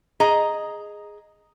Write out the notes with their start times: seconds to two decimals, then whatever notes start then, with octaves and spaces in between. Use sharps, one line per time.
0.20 G#4 D#5 A#5